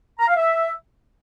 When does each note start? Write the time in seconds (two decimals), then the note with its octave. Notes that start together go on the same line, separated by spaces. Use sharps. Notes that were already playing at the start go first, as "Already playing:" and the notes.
0.20 A#5
0.28 F5
0.36 E5